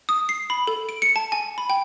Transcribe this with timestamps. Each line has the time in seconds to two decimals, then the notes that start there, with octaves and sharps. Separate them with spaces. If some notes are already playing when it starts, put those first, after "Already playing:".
0.09 D#6
0.29 C7
0.50 B5
0.67 A4
0.89 D7
1.02 C#7
1.16 A5
1.32 G#5
1.58 B5
1.70 G5